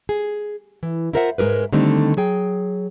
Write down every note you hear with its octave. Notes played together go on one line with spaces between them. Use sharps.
G#4
E3
E4 F4 A#4 C5 E5 F#5
G#2 G#3 G#4 A#4 B4
D3 D#3 G3 A3 C4 D#4
F#3 G#4 G5